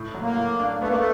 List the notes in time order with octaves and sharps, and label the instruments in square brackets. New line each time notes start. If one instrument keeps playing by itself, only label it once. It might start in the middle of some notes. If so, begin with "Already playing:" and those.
Already playing: [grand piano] A2
F#3
[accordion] A#3
[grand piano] A2
D4
[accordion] A3 [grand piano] B3
[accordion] A#3
A3